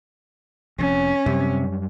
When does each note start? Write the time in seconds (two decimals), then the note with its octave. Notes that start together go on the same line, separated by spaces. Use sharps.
0.79 F1 F2 C#4
1.26 F#2 C3 G3